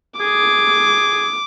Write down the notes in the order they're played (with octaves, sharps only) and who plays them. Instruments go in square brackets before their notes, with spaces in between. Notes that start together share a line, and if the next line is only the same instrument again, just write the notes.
[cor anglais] G#4 [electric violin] D6